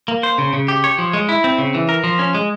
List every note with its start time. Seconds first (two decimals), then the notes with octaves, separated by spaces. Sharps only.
0.08 A#3
0.23 C5
0.38 C#3
0.53 C#3
0.68 G4
0.84 C#5
0.98 F3
1.13 G#3
1.29 E4
1.44 C4
1.58 C#3
1.74 E3
1.89 A#4
2.04 F3
2.19 C#4
2.35 G#3